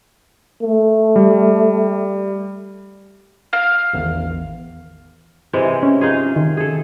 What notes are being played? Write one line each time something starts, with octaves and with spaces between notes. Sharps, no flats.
A3
G3
F5
A1 E2 D#3
C3 E3 G#3
C#4
D#4 F4 G#4
D#3
G#4 A4